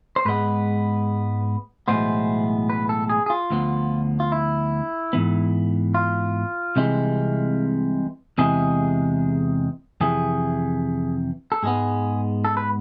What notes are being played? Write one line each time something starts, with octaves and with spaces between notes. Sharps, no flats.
C5
G#2 G#3 B3 B4
B1 A2 E3 G#3 B3 C5
B4
A4
G#4
G#4
F4
D2 D3 F3 B3
F4
E4
G#2 E3 B3
F4
C2 C3 E3 G#3
E2 C3 E3 G#3 G#4
F2 C3 E3 G#4
A4
G#2 G#3 B3 G#4
A4
B4